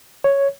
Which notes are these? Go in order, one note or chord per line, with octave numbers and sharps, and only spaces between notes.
C#5